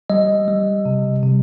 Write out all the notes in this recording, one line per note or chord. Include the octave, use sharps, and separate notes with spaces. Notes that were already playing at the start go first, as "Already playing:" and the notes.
G3 D#5
G3
C3
C3